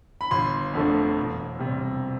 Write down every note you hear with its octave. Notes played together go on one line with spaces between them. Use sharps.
B5
G1 C6
F2 D3 A3
E1
C3 G3